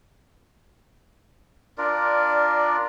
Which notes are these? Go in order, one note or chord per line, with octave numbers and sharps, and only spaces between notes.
D4 F4 A#4 D5